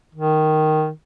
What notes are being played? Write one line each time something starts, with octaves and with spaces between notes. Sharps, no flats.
D#3